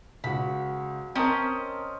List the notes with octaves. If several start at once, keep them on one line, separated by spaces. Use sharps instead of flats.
C#2 F#4 B5
C4 C#4 A#4 D#5 A5 A#5